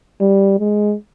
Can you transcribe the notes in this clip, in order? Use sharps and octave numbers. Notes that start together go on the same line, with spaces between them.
G3
G#3